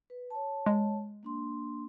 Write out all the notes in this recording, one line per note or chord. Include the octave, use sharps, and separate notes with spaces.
B4
C#5 A5
G#3
A#3 D4 C6